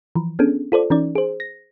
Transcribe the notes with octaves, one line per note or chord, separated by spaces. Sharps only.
E3 F3
B3 C#4 D4 G#4 A4
F4 A4 C5 D5
E3 C#4 D#4 D5
G#4 C5
A#6